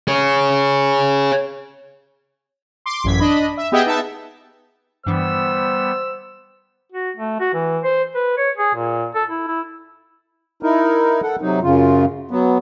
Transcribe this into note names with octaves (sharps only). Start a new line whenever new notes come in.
G#4 C#5
C6 D6
A1 F#2 G#6 B6
D4 D#5 B5
E5
B3 G4 G#4 D#5 E5 G5
B3 D#4 E5 A5
G2 D3 E3 G3 B3 C5 E6
F#4
A3
F#4
E3
C5
B4
C#5
G#4
A#2
A4
E4
E4
D#4 E4 A#4
A4 F#5
C3 F#3 D#4
F#2 C#3 F4
F#3 B3